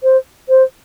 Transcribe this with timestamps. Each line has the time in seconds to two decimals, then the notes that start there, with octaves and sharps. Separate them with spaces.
0.03 C5
0.49 C5